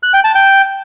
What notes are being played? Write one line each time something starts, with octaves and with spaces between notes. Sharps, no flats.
F#6
G5
A5
G5